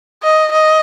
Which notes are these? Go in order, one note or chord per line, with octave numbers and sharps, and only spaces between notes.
D#5
D#5